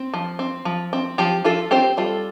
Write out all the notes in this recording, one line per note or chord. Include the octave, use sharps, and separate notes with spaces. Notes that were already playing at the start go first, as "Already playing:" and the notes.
Already playing: C4
F3
C4
F3
C4
F3 G4
F3 F4 A4
C4 G4 C5
G3 F4 A4